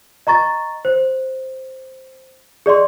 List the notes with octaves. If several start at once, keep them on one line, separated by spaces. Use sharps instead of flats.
D#5 A#5 C#6 A6
C5
G#4 D5 D#5 C6